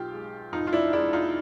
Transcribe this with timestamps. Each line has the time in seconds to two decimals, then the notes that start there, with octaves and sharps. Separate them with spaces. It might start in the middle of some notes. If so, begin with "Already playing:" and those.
Already playing: B1 F4 G4
0.13 G#3
0.53 F1 D#4 F4
0.67 F4
0.73 D4 E4
0.93 G#3 D4 E4
1.13 D#4 F4